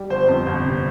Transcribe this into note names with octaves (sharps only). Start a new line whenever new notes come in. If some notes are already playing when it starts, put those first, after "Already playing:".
Already playing: G3
G1 C5
F2
G1
C3